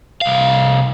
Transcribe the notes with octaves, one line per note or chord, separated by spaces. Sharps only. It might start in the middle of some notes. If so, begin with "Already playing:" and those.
C2 F5